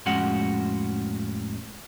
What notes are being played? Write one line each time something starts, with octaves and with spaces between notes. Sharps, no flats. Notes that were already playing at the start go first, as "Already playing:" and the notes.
F2 A2 G#3 C#4 F#4 F#5